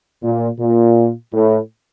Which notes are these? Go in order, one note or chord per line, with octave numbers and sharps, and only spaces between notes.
A#2
A#2
A2